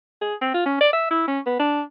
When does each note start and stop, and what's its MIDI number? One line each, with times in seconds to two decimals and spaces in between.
0.21 0.35 68
0.42 0.51 60
0.54 0.65 65
0.66 0.78 61
0.81 0.89 74
0.93 1.07 76
1.11 1.26 64
1.28 1.40 61
1.46 1.59 59
1.60 1.81 62